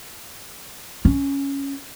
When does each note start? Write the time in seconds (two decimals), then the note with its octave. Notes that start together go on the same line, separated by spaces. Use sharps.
1.05 C#4